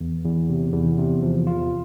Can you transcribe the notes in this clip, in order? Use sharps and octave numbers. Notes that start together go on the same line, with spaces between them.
E2
E2
C3
E2
C3
F3
F4